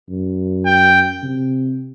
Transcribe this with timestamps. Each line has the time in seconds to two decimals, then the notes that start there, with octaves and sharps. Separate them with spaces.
0.09 F#2
0.66 G5
1.23 C3